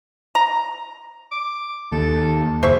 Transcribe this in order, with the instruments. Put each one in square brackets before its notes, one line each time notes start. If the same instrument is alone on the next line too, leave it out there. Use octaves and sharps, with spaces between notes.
[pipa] A#5
[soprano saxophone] D6
[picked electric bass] D#2 [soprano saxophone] A4
[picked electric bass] F#1 [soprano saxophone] G#4 [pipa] C5 E5 C#6